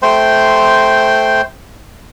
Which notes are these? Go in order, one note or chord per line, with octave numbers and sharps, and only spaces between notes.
A3 C5 G5 C6